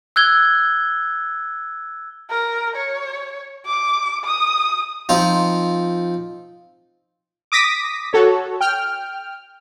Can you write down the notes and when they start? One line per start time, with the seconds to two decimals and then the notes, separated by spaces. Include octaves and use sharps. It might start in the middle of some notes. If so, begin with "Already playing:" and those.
0.16 E6 F#6 G#6 G7
2.30 A#4
2.76 C#5
3.66 D6
4.25 D#6
5.09 F3 C4 D#4 F4
7.52 D6 D#6 A#6 B6
8.13 F#4 A4 C#5
8.61 G5 F6